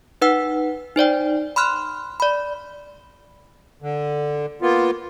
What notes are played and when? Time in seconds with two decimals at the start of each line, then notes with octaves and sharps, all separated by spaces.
0.21 D#4 B4 F#5 E6
0.96 D#4 C5 D5 G5
1.56 B5 C6 F6 F#6
2.20 D5 B5
3.82 D3
4.62 A#3 B3 F4